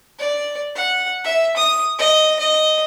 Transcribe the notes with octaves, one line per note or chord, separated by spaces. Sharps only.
D5
F#5
E5
D#6
D#5
D#5